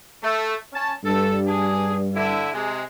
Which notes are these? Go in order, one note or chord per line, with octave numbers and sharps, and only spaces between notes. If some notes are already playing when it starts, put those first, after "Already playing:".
A3
C#4 A5
G2 A4
D4 G#4
D3 E4
C3 G#3